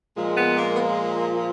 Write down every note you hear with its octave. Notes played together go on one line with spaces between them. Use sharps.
A#2 F3 G#3
B3
A#3
B3
A#3